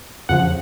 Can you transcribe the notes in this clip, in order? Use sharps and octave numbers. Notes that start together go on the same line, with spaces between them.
F2 C#3 F3 F#5